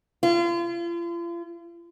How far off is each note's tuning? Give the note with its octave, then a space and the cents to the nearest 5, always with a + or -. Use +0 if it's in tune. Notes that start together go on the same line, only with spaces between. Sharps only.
F4 -40